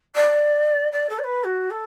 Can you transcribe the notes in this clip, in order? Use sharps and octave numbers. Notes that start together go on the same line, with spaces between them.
D5
D5
A4
D5
B4
F#4
A4